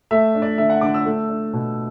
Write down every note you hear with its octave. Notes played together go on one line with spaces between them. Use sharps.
A3 E5
D4
D5
D3 E5
F#5
D3 D6
E6
A3
D4
B2